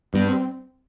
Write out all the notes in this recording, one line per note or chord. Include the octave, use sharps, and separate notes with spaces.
G2 B3
C4
C4